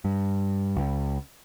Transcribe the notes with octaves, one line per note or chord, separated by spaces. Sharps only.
G2
C#2